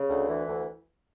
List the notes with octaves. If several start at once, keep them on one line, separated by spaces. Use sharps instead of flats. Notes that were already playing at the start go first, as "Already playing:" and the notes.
Already playing: C#3
D2
E3
D2